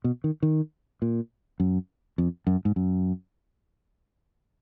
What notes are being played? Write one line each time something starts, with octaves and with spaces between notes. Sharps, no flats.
B2
D#3
D#3
A#2
F#2
F2
F#2
G#2
F#2